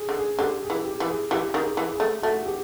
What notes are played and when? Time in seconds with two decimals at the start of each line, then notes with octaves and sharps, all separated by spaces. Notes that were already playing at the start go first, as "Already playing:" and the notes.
Already playing: G#4
0.09 D3
0.16 G#4
0.39 D3 G4
0.62 G#4
0.70 E3
0.85 G4
1.00 E3
1.08 G#4
1.31 E3 G4
1.54 D#3
1.61 G#4
1.77 E3
1.92 G#4
2.00 A3
2.22 A3 F#4
2.41 G#4
2.46 G4